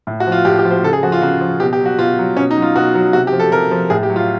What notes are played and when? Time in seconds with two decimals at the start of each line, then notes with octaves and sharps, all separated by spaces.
0.07 A2
0.20 F#4
0.27 F3
0.32 F4
0.45 A2 G4
0.59 G4
0.65 F3
0.70 C5
0.83 C#3 A4
0.93 G#4
1.03 F3 F#4
1.12 F4
1.22 C#3 F#4
1.41 F3
1.60 B2 G4
1.73 G4
1.80 F#3
1.86 F#4
1.98 B2 F4
2.18 F#3
2.37 B2 C#4
2.51 D#4
2.57 F#3
2.62 F4
2.76 B2 F#4
2.95 F#3
3.13 C3 F#4
3.27 G4
3.32 F3
3.39 A4
3.52 C3 A#4
3.71 F3
3.90 A2 G#4
4.03 G4
4.10 F#3
4.16 F4